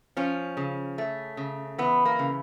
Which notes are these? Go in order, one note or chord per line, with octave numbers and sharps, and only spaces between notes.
F3 C#4
C#3
A3
C#3
E3 B3
A#3
C#3